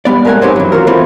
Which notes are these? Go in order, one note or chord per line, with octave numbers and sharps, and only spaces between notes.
G3 B3 D5
G#3 A3 A#4 B4 F#5 G#5
G2 C4 C#4 D#4 G4
E3 F#3
F4 F#4 A#4
E3 A3 C4 F4